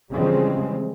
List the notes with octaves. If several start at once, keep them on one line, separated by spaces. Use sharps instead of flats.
C#3 E3 F3 G3 G#3 C4